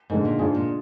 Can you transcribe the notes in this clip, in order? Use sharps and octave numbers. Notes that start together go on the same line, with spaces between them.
G#2 D3 G#3 D#4
A#2
G#2 G#3 D4 F4 G#4
A#2